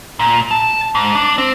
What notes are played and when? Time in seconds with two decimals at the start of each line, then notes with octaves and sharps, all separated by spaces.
0.19 A#2
0.51 A5
0.95 G#2
1.15 D4
1.38 C4